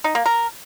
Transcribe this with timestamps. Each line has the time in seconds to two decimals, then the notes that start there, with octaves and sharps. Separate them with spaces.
0.04 D#4
0.15 A#3
0.26 A#4